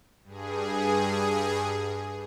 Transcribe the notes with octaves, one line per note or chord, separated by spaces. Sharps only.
G2 G#4